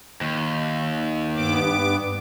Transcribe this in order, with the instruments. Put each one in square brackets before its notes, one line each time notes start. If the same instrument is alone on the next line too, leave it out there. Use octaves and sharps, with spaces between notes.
[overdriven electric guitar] D#2
[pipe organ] G2 B3 D6